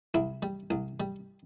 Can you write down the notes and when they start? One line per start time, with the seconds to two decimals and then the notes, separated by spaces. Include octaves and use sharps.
0.14 C2 E4
0.42 G3
0.70 C2
1.00 G3